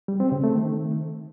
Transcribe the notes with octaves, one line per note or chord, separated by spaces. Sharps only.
G3
C4
C#3
A3
D#3